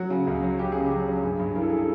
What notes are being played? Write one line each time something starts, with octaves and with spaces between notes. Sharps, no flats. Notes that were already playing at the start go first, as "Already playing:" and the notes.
Already playing: F#3 F#4
C#3
C#2
F#3
C#3 G4
C#3 G#4
G4
F#3
F#3
G2 G#4
G2
E3 A#4
A4
G#4
A4